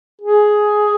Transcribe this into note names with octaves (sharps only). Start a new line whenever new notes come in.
G#4